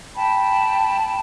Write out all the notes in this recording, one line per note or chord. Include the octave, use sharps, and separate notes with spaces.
G5 A5 B5